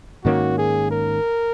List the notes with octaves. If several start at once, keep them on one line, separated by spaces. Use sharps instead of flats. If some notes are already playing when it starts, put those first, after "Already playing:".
G#2 D#3 A#3 C#4 F#4
G#4
A#4